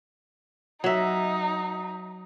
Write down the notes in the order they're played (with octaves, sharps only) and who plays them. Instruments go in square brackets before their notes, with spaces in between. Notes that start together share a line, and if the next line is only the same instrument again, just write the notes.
[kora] F#3 E5 [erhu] D#4